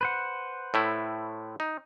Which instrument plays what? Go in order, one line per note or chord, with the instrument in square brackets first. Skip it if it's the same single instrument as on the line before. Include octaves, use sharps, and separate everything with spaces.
[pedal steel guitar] B4 C5 F#5
[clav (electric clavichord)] A2 A3 E4
D#4